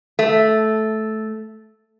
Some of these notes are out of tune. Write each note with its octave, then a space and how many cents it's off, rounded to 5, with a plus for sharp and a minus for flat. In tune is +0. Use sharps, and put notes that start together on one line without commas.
A3 -10